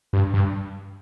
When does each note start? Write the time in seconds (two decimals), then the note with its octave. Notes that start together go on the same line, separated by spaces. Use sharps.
0.13 G2
0.34 G2